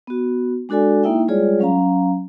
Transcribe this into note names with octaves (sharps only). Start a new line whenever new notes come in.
B3 F#4
G#3 D4 F#4 A4 D5 G#5
A#3 D#4 E4 E5 G5
G3 G#3 F4 G#4 C#5 D5
F#3 C#4 F5 A#5